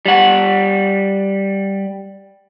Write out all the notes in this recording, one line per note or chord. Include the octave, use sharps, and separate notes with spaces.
G3 F#5